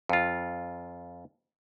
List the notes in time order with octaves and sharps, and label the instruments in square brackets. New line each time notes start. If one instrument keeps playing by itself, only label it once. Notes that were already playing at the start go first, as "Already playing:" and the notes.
[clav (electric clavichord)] F2 F4